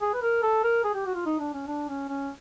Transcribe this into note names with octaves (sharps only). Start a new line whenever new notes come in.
G#4
B4
A#4
A4
A#4
G#4
G4
F#4
F4
D#4
D4
C#4
D4
C#4
C#4